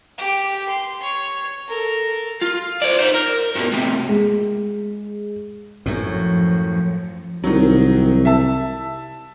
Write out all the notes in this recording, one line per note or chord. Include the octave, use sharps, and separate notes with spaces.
G4
C6
C#5
A4 A#4
F4
C5 D5
D#4 C5
A#4
G2 B2
A2 C3
G#3
F#2 A2 F3
C2 D#3 F#3
E5 A5